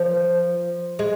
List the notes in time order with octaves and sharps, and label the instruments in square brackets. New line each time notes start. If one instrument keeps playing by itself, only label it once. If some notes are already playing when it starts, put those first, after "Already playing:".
Already playing: [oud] F3
G#3